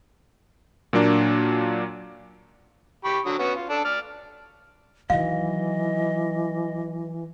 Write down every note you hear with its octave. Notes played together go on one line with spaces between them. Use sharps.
A#2 F#3 A#3 D4
G4 B5 C#6
D3 F#3 D#6
B3 C#4 F#4
F4
D4 A4
D5 F6
D#3 E3 F#3 D#5 F5